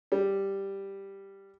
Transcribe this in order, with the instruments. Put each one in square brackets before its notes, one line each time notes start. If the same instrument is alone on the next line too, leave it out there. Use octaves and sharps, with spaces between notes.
[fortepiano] G3